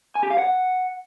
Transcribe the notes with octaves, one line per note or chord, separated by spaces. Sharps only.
G#5
G4
F5
F#5